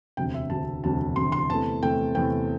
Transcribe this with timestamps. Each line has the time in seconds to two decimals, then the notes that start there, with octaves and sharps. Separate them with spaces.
0.17 E1 D2 C3 G5
0.34 E5
0.50 E1 D2 C3 A5
0.84 E1 D2 C3 A5
1.16 E1 D2 C3 C6
1.32 C6
1.50 E2 C3 A3 A5
1.82 E2 C3 A3 G5
2.15 E2 C3 A3 G5